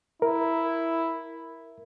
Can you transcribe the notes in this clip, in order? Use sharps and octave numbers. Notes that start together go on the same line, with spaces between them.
E4 A#4